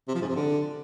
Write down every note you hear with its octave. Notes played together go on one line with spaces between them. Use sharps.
C3
F3
G#2
C3
D3